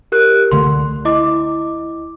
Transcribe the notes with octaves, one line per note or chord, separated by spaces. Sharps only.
G4 A#4 F#6
C#2 D3 A3 C6
E4 D#5 D6